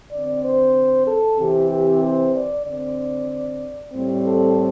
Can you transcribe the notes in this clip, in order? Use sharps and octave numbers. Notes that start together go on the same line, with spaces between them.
D3 C4 D5
C5
A4
C3 E3 C4 G4
G4
C5
D5
D3 C4 D5
A2 G3 C4
A4